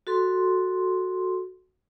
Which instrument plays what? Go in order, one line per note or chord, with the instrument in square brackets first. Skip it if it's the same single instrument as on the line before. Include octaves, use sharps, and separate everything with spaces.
[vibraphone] F#4 A4 C6